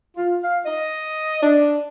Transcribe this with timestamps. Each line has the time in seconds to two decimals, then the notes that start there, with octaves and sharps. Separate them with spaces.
0.17 F4
0.43 F5
0.66 D#5
1.43 D4